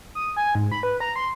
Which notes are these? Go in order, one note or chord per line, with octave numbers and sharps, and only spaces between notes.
D#6
G#5
G#2
B5
B4
A#5
C6